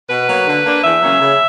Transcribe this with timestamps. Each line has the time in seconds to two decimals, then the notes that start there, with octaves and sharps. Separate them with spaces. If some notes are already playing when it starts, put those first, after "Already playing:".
0.09 B2 B4
0.28 F#3 A#3
0.46 D3
0.65 A#3 D4
0.83 E2 E5
1.02 C#3 F#3 A#3 C#4
1.21 C#3